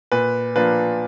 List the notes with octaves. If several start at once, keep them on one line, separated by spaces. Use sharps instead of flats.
A#2 B4
F3 A#3 D4 B4